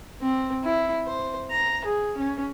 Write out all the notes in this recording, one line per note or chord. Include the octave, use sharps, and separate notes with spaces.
C4
E4
C5
A#5
G#4
C#4